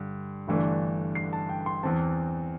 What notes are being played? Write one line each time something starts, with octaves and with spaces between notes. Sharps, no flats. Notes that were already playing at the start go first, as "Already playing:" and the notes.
Already playing: G2 D3
G1 G2 E3 A3 D4
C7
A5
G5
C6
E2 E3 C4 A5